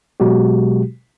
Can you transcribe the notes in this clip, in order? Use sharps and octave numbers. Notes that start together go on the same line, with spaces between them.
B2 F#3 G#3 F#4 G4